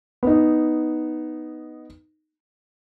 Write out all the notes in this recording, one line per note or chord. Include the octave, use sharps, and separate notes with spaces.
B3 D#4